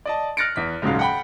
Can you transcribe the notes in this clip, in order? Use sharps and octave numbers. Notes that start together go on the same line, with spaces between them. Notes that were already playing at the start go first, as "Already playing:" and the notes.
D5 D#5 A5
F6 F#6 A6 A#6 C#7 D7
E2 B6
D#1 G#2 C#3 F#3 F5
F#5 G5 B5